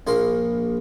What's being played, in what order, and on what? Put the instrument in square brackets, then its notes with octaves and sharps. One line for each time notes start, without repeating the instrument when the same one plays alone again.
[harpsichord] A#1 A#3 C6